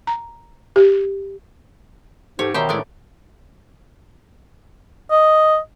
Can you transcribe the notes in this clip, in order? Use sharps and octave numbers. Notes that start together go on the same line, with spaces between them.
A#5
G4
G#2 G4 A4 C5 C#5
B2 D#3 G4 C5 C#5 E5 G5 A#5
A2 G#3 B3 E4 D5
D#5